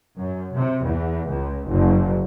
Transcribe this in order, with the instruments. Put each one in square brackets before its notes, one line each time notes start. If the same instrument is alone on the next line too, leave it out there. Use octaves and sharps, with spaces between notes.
[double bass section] F#2
C3
E2
C#2
F#1